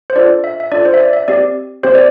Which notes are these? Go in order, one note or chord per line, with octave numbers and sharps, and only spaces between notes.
C5
D4 F4 A4 D5
E5
E5
D4 F4 A4 D5
C5
E5
D5
E5
C4 G4 D5
C4 G4 C5
D5